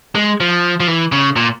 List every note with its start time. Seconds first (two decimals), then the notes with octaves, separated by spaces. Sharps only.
0.15 G#3
0.40 F3
0.80 F3
0.87 E3
1.12 C#3
1.36 A#2